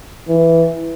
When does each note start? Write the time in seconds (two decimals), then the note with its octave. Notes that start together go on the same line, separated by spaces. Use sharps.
0.28 E3